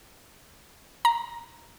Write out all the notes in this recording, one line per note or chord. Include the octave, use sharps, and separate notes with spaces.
A#5